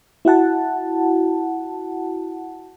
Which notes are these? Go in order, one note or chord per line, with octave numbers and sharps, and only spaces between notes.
E4 F#4 F#5 A5